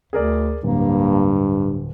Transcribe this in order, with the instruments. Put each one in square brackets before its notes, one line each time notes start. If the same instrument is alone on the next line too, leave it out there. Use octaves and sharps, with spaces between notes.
[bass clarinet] D2 [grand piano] G#4 A#4 D5
[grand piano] D1 [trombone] G2 [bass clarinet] A#3